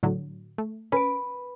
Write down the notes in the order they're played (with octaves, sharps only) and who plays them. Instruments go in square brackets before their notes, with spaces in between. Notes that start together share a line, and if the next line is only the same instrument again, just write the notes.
[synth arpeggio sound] A2 D3 F#3
A3
[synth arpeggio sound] C#4 D7 [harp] B4